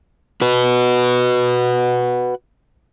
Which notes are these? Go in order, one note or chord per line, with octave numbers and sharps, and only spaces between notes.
F#4 B4